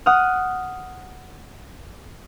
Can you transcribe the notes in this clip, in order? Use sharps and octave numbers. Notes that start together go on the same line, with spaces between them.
F#5 D#6 F6